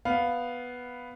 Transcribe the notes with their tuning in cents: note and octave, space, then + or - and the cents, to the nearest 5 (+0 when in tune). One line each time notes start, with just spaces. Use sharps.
B3 +0 F5 +0